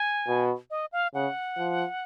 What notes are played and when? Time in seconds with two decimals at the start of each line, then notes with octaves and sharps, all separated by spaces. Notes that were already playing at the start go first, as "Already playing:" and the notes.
Already playing: G#5
0.27 B2
0.70 D#5
0.92 F5
1.14 C#3 F#5
1.58 F3